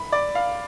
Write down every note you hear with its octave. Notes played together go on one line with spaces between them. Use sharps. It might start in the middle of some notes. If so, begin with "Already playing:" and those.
Already playing: B5
D5
F5